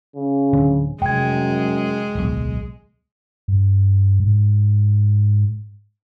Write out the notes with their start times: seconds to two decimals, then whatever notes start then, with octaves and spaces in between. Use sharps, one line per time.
0.16 C#3
0.53 D1 D3 C4
1.02 F1 F#2 G#3 G5 G#6
2.15 D1 B1
3.48 G2
4.20 G#2